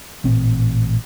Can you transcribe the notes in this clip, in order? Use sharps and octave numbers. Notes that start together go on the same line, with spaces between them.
A1 A#2 C4